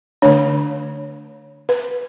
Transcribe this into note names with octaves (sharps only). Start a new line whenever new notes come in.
D3 A3 D4 C#5
B4